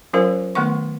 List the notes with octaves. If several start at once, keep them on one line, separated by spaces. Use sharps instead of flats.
F#3 C#4 F4 A#4 C5 F5
D#3 A3 B3 F#5 C#6